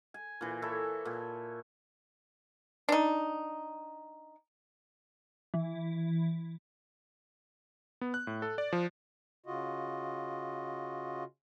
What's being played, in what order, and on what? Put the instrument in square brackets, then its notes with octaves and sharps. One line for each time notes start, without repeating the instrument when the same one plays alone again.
[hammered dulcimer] G#5
A#2 E3
E4 A4 C#5
A#2
[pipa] D4 D#4
[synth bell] E3
[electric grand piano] B3
F#6
A2
A4
D5
F3
[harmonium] C#3 F4 F#4 D#5